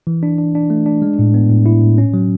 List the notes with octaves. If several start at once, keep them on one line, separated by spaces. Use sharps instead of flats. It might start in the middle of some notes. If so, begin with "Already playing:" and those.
E3
D4
D4
D4
A3
D4
G#3
A2
B3
A2
E4
A2
C#4
F#3